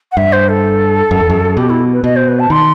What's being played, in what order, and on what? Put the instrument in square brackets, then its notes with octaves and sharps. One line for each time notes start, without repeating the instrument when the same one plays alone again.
[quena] F#5
[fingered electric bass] G2 [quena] E5
[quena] C5
A4
[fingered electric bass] F#2
E2
F#2
[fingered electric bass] B2 [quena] G4
[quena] E4
B4
[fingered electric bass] B2 [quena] D#5
[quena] C5
B4
A5
[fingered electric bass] D#3 [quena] C6